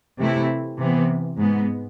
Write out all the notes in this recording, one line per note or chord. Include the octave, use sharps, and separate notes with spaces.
C3 E3 A3 C4 E4
C3 E3 B3
G#2 G#3 B3